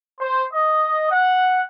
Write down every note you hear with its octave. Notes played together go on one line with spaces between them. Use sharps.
C5
D#5
F#5